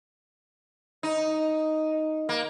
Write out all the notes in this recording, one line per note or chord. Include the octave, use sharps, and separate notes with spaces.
D#4
A#3